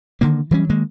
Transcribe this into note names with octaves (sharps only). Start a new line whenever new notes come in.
D3 D#3 A#3
E3 F#3 G3 C#4
D#3 G#3 A#3